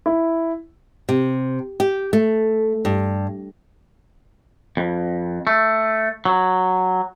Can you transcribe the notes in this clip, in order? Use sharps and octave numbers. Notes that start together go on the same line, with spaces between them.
E4
C3
G4
A3
G2
F2
A3
F#3